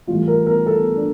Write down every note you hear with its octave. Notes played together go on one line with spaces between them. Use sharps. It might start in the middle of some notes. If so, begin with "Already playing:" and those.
A2 E3 G3 F4
A#4
A#4
A4
D4